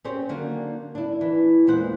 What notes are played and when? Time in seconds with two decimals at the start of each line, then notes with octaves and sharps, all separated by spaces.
0.04 C4 C#4 G4 G#4 C5 C#5
0.29 D3 D#3 F#3 A#3 D4
0.95 D4 E4
1.21 E3
1.67 E2 A#2 E3 G#3 C5 F#5